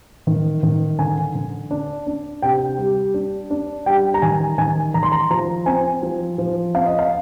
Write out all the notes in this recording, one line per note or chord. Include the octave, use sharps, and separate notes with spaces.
D#3
D#3
D3 G#5
D3
D4
D4
C3 G5
G3
D4
D4
G3 G5
A#5
D#3 G#5
D#3 G#5
D#3 A#5
C6
A#5
F3 A#5
C4 G#5
F3
F3
C4 F5
D#5
F5